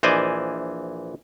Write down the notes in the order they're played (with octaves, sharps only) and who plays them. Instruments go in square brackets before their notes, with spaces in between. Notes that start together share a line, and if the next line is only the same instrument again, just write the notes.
[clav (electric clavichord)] A#1 E3 C5 D5 D#5 G#5